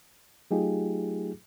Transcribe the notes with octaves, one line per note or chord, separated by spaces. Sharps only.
F#3 A3 D#4 F4 G4 G#4